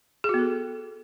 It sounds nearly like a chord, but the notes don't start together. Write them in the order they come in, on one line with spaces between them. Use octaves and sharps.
G#4 F#4 B3 A4